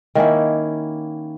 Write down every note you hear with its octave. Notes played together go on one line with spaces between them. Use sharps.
D#3 A#3 C#4 E4